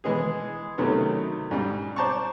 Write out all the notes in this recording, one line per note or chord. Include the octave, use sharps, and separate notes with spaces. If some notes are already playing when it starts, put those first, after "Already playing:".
E3 G#3 B3 G#4
C3 D#3 F#3 A3 B3 C#4
G#2 G3
C5 D5 A5 A#5 C#6